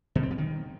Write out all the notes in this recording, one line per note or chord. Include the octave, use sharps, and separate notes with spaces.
B2
C4
F3
D#3